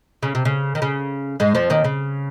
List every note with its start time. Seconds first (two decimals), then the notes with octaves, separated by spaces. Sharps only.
0.23 C#3
0.35 C3
0.45 C#3
0.75 D#3
0.82 C#3
1.40 G#2 G#3
1.55 F2 F3
1.70 D#2 D#3
1.84 C#3